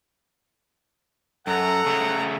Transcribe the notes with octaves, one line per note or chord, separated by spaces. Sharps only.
F#2 A4 F#5 A#5
C#3 A3